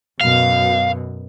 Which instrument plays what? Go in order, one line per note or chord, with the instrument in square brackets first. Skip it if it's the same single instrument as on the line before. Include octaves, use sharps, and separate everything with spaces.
[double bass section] F#2 B2 [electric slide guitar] F5